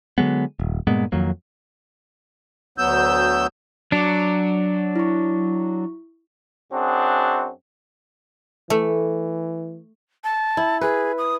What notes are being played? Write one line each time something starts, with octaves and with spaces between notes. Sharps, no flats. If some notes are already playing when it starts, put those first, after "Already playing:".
D3 F#3 G#3 B3
D#1
G2 A#2 G#3 B3
F2 D#3 F#3 A#3
D2 F#3 B3 E6 G6
F#3 D4 D6 C#7
E4 C#6
F#2 C4 D4 F#4 G#4
E3 A3
A5
E4
G#4 B4
D#6